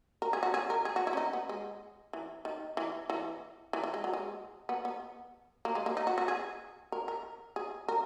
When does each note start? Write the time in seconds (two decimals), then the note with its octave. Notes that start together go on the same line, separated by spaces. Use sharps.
0.22 A#4
0.33 G#4
0.43 F#4
0.54 G#4
0.70 A#4
0.85 G#4
0.96 F#4
1.07 E4
1.13 C#4
1.17 D#4
1.33 B3
1.49 G#3
2.13 E3
2.45 D#3
2.77 E3
3.10 E3
3.73 E3
3.84 E3
3.94 G#3
4.04 F#3
4.13 G#3
4.69 B3
4.85 B3
5.65 A#3
5.75 G#3
5.86 A#3
5.97 D#4
6.07 F#4
6.18 F#4
6.28 G#4
6.92 A#4
7.08 A#4
7.56 G#4
7.88 A#4